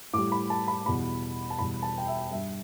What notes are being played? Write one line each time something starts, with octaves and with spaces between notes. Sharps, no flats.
A2 G3 D6
B5
A5
B5
E2 B2 G3 B5
A5
E2 B2 G3 B5
A5
G5
E5
G2 G3 E5